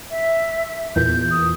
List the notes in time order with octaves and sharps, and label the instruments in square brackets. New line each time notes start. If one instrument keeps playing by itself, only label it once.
[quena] E5
[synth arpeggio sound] E2 A#2 [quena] G6
[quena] D#6